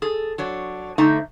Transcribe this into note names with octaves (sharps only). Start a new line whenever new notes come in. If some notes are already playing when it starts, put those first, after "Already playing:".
G#4 A4
F#3 D4 C#5
D3 A3 D#4 C5 E5 A#5